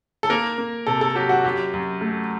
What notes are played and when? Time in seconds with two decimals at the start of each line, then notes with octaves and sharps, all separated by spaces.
0.23 A4
0.30 A#3 A#4
0.58 A#3
0.87 C3 A4
1.01 A4
1.15 F#3 G4
1.29 F#4
1.45 F#2 G4
1.73 F#2
2.01 A3